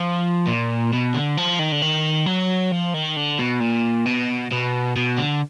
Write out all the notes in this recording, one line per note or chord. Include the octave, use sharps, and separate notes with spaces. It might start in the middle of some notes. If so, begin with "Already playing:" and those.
Already playing: F3
A#2
B2
D3
F3
D#3
D3
D#3
F#3
F3
D#3
D3
B2
A#2
B2
B2
B2
D3